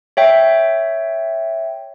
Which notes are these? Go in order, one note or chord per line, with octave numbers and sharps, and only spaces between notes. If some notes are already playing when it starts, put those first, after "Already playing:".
C#5 E5 G5